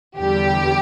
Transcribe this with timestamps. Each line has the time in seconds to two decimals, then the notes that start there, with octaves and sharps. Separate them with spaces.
0.18 E2 D3 G3 G4